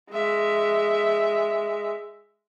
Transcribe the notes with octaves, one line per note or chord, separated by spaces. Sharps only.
G#3 E5